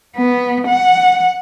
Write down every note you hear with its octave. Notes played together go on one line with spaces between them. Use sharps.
B3
F#5